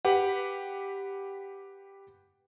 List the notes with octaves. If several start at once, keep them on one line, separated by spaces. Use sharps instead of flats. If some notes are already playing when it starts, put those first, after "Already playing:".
G4 B4 F#5